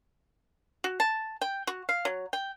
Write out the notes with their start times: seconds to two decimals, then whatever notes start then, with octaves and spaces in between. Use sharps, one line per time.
0.84 F#4
1.00 A5
1.41 G5
1.67 F#4
1.89 F5
2.05 F#3
2.33 G5